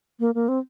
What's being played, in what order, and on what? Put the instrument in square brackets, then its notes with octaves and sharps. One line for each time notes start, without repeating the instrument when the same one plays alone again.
[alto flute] A#3
A#3
C4